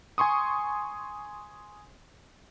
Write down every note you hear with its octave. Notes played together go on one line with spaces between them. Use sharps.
G#5 C6 C#6 D#6